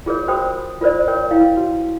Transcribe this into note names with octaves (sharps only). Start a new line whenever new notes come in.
F4 G#4 A#4 C#5
F#4 A#4 C5 G5 B5 D#6
F4 A#4 C5 D5
A#4 C#5 G5
E4 F5 G5
F#4